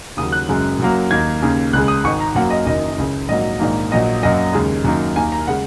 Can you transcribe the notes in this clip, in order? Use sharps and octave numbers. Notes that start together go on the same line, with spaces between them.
D#2 C#3 F#3 D#6
F#6
F#1 F#2 C#3 G#3
F#2 F#3 A#3
D#2 D#3 A#3 G#6
D#2 C#3 A#3
C#2 C#3 G#3 F#6
D#6
G#1 G#2 D#3 G#3 C#6
A#5
F#2 F#3 A#3 F#5
D#5
F#1 F#2 D#3 D#5
C#2 C#3 G#3
A#1 G#2 F#3 A#3 D#5
A#1 G#2 D#3 A#3
A#1 A#2 F#3 D#5
F#2 F#3 A#3 D#5
D#2 C#3 G#3
F#2 D#3 A#3
D#2 D#3 A#3 G#5
A#5
C#3 G#3 F#5